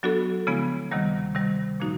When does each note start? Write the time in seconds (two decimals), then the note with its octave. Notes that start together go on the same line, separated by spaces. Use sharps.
0.03 F#3 B3 D4 F#4 A4
0.47 C#3 F3 G#3 B3 E4
0.91 D2 C3 D#3 G3 A#3
1.35 C3 D#3 G3
1.80 A#2 F3 A#3 D#4 F#4